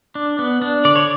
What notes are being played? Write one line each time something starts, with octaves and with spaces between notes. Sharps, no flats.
D4
B3
D4
D3 D5
C#5